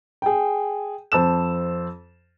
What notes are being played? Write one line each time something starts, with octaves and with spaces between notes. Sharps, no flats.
G#4 G5
F2 C5 A5 E6 E7